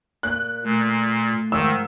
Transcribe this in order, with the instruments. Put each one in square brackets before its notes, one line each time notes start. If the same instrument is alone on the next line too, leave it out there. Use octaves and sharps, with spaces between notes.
[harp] A#2 [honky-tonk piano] F#6
[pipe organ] A#2 [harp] A3
[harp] G#2 F3 [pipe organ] D#3 [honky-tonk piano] E6